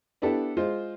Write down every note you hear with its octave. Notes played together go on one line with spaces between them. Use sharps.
B3 D4 E4 G4 A4
G#3 F4 C5